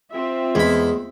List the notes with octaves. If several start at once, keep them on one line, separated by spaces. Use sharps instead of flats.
C4 F4 E5
E2 G#3 B5